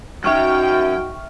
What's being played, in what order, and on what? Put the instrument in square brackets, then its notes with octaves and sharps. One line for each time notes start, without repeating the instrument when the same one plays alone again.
[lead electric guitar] F#2 F#3 [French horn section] D#4 F#4 [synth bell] E5 C#6 F6 [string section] G5